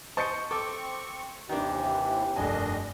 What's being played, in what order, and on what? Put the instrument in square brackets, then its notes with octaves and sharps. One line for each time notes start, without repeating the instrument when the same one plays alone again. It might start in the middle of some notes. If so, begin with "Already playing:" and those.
[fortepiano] C5 D#5 A5 [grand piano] C#6 G6 C#7
[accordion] C4 C#6 [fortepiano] A4 [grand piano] D6
[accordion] D#2 C3 E3 [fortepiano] D#3 D4 [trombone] G4
[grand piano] F1 G2 G#5 [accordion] D#3 D4 D#5